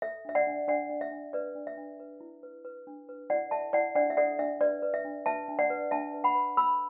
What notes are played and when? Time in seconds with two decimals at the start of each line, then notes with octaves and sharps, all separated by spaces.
0.02 A4 E5
0.25 D4 E5
0.35 D5 F#5
0.47 D4
0.68 D4 D5 F#5
0.90 D4
1.01 E5
1.11 D4
1.33 B4 D5
1.55 D4
1.67 E5
1.77 D4
2.00 B4
2.21 E4
2.43 B4
2.65 B4
2.87 D4
3.09 B4
3.30 E4 D5 F#5
3.51 A4 E5 A5
3.73 E4 D5 F#5
3.95 D4 D5 F#5
4.10 E5
4.17 A4 D5 F#5
4.39 D4 E5
4.61 B4 D5
4.82 B4
4.94 E5
5.05 D4
5.26 B4 E5 A5
5.48 D4
5.59 D5 F#5
5.70 B4
5.91 D4 E5 A5
6.14 B4
6.24 F#5 B5
6.35 B4
6.57 A4 B5 E6